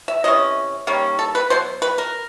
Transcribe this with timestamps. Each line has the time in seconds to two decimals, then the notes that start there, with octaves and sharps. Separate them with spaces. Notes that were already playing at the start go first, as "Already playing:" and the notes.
0.08 E5
0.24 C3 E3 C#4 D#5
0.87 D#3 G3 A#3 C#4
1.19 A4
1.35 B4
1.50 B2 F#3 C5
1.82 B4
1.98 A#4